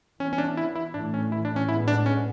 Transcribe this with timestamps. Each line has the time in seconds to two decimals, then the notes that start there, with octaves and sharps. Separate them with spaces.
0.20 E3 B3 C#4
0.33 C#4
0.38 D4
0.57 E4
0.76 E4
0.94 A2 E3 A3 D4
1.14 C#4
1.32 E4
1.45 D4
1.56 C#4
1.69 A2 G#3 B3 E4
1.88 D4
2.06 C#4